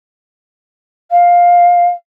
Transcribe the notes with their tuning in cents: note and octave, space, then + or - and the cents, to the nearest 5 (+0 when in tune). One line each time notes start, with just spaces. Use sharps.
F5 +10